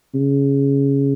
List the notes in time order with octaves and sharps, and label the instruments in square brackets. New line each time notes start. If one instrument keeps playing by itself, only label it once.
[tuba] C#3